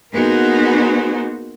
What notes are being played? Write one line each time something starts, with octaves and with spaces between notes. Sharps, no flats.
A#3 B3 D#4 F#4 G#4 C5